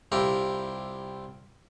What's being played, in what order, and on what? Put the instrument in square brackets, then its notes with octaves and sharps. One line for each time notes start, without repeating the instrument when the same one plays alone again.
[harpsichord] C2 E4 F4 G4 A#5